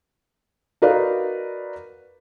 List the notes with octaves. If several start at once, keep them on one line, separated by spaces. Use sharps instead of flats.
D#4 F#4 A#4 B4 D5 F5